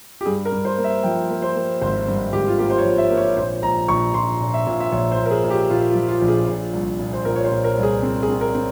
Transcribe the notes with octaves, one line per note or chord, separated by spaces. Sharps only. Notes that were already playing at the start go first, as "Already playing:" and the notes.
G4
G2 G#4
A#4
G2
C5
A#3
E5
F3 G5
A#3
C5
A#3
G#1 C5
G2
G#1 G4
F4
A#3 G4
C5
C#5
F3
E5
A#3
C#5
A#1 C5
A#1 A#5
A#1 C#6
A#1 C6
A#2
E5
A#2
E5
A#1 C#5
C5
A#1
A#4
G#4
A#2
G4
A#2 F4
F4
F3
F4
A#1
G#4
A#2
C2
A#2
C5
A#2 A#4
C#5
C5
A#2
A#4
C2
G#4
C4
G#4
C4
A#4
C4